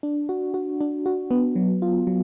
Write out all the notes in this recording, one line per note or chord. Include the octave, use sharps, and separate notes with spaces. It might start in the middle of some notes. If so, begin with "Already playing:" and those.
D4
F#4
F#4
D4
F#4
B3
F#3
F4
F#3